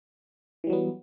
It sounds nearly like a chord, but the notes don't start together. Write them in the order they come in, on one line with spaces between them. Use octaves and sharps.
E3 G3 F#3 B3